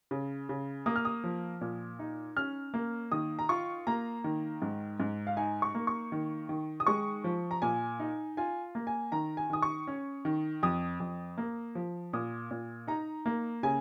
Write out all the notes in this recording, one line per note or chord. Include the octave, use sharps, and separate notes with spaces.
C#3
C#3
A#3 D#6
F6
D#6
F3
A#2
D#4
C#4 F6
A#3
D#3 D#6
A#5
F4 C#6
A#3 A#5
D#3
G#2
G#2
F5
D#4 G#5
C#6
A#3
C#6
D#3
D#3
D#6
G#3 C#6
F3
A#5
A#2 G#5
D#4
F4 G#5
A#3
G#5
D#3 A#5
G#5
D#3 D#6
C#6
C#4
D#3
F2 D#6
F2
A#3
F3
A#2 D#6
A#2
D#4 A#5
A#3
C#3 G#5